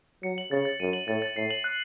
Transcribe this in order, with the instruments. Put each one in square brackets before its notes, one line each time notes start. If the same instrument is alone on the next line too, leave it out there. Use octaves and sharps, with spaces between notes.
[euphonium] F#3 [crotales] C#7
[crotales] F#7
[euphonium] C#3 [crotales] A6
[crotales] A6
[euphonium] F#2 [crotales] D#7
[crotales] F#7
[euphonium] A2 [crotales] A6
[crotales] A6
[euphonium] A2 [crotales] C7
[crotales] F#7
F#6